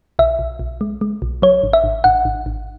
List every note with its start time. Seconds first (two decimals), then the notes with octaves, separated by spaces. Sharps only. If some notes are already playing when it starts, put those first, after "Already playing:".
0.19 B1 E5
0.39 B1
0.59 B1
0.81 G#3
1.01 G#3
1.22 B1
1.42 F#3 C#5
1.63 G#1
1.73 E5
1.84 G#1
2.04 G#1 F#5
2.25 G#1
2.46 G#1